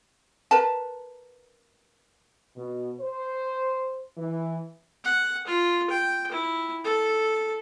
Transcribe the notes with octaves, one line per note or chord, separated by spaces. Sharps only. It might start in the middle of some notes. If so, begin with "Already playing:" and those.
A#4 B4 A5
B2
C5
E3
F#5
F4
G5
E4
A4